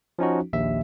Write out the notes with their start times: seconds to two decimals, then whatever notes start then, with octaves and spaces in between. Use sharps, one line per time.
0.19 F3 C#4 D#4 F#4
0.53 A#1 D#2 E5